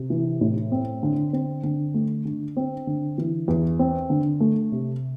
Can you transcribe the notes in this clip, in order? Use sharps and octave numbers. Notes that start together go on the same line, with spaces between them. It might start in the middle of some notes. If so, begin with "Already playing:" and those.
Already playing: C3
E3
A2
C4
D3
C4
D3
A3
D3
C4
D3
E3
E2
C4
D3
A3
C3